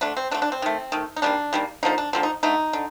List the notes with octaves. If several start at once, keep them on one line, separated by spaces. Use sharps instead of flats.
D3 A3 D4
C4
D3 A3 D4
D4
C4
D#3 A3
D#3 A3
D#4
D#3 G3 A#3 D4
D#3 G3 A#3
D3 F3 A#3 D#4
D4
D3 F3 A#3 C4
D#4
D3 A3 D#4
D3